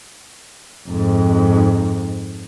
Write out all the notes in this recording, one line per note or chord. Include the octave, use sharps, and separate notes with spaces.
F2 G#2